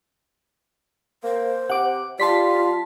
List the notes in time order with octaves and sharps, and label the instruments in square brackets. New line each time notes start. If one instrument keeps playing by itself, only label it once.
[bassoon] A#3 [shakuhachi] C5
[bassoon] C3 [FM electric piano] F#5 D6
[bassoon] G3 [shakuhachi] F4 [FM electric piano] A5 C6 B6